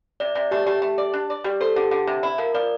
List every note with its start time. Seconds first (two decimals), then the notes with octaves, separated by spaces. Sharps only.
0.20 C3 D5
0.35 C3 D5
0.51 A3 G4
0.66 A3 G4
0.82 A3
0.98 D5
1.14 D4
1.30 D5
1.44 G3 G4
1.61 A4 C5
1.76 D3 G4
1.91 D3
2.07 C3
2.23 E4
2.38 F3 A#4
2.54 F3 D5